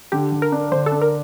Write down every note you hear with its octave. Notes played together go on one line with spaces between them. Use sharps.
D3 G4
D3
A#4
D4
D3 C5
A4
D4
A#4